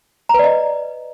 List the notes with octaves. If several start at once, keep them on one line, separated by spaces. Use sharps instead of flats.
B4 D5 D#5 A#5